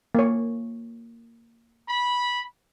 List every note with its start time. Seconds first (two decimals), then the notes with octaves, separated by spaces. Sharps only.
0.15 A#3 C#5
1.89 B5